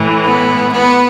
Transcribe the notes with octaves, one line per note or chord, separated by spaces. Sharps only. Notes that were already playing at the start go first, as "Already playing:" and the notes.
Already playing: A2 E3
B3
B3